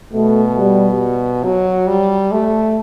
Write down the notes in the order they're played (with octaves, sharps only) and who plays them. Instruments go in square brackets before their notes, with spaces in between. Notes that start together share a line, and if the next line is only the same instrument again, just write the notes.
[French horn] B2 [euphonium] A3
[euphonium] G3
[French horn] F#3
G3
A3